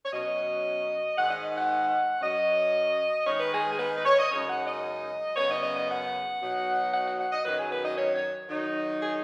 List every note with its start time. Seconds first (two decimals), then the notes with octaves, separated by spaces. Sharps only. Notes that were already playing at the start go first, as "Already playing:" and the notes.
0.05 C#5
0.12 B2 F#3 C#4 D#5
1.17 G#2 D#3 G#3 F#5
1.30 D#5
1.56 F#5
2.21 F#2 F#3 C#4 D#5
3.26 D#3 G#3 D#4 C#5
3.39 B4
3.52 G#4
3.71 G#4
3.79 B4
3.98 B4
4.06 C#5
4.18 D#5
4.31 F#2 C#3 G#3 D#4 C#5
4.48 F#5
4.66 D#5
5.36 F#2 C#3 B3 C#5
5.49 D#5
5.62 D#5
5.76 D#5
5.89 F#5
6.41 B2 F#3 D#4
6.92 F#5
7.06 F#5
7.19 F#5
7.32 D#5
7.45 F#2 D#3 F#3 B4
7.58 G#4
7.72 B4
7.84 D#5
7.97 C#5
8.14 C#5
8.49 D#3 F#3 D#4
9.01 G#4